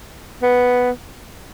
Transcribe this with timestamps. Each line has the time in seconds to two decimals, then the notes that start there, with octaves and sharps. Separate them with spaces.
0.43 B3